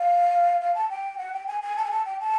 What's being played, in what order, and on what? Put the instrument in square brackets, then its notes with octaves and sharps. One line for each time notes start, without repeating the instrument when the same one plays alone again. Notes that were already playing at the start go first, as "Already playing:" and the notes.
Already playing: [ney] F5
F5
A5
G5
F#5
G5
G#5
G#5
A5
G#5
A5
G5
A5